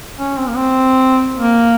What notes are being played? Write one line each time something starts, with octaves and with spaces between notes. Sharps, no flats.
C#4
C4
A#3
C4
A#3